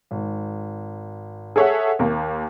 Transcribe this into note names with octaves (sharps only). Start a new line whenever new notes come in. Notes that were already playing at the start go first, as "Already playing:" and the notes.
G#1
G#4 A4 C#5 E5 F#5
D#2 A#3